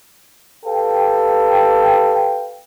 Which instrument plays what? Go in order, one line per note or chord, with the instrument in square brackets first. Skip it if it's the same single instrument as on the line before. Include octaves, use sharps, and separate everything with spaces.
[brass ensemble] G4 A4 B4 F5 G5